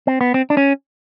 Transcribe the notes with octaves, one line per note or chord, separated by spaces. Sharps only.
C4
B3
C4
D4
C#4